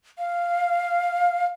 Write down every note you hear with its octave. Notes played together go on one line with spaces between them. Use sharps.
F5